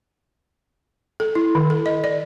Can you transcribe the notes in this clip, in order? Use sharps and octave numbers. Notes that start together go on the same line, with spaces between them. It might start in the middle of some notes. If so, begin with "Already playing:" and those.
A4
E4
D#3
A4
D#5
D5